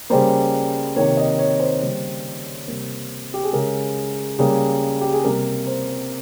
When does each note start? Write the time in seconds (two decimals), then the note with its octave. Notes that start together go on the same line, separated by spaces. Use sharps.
0.10 C#3 G3 A#3 C5
0.96 C3 D#3 A#3 C#5
1.17 D#5
1.39 C#5
1.60 C5
1.81 C#3 G3 A#3
2.67 C3 G3 A#3
3.34 G4
3.44 G#4
3.53 C#3 G#3 A#4
4.39 C#3 G3 A#3
5.01 G4
5.13 G#4
5.24 C3 G3 A#3 A#4
5.67 C5